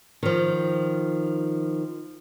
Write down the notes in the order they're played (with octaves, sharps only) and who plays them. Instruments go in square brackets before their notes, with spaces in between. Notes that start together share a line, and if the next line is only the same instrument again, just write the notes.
[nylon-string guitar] D#3 F3